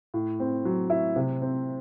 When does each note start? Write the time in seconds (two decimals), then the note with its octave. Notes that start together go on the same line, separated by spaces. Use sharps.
0.14 A2
0.40 C4
0.65 F#3
0.90 E4
1.16 C3
1.41 C4